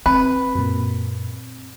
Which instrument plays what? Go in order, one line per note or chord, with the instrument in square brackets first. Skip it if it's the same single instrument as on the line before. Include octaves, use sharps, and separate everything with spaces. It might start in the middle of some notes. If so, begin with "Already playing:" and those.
[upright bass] C4 [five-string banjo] B4
[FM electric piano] F#2 A#2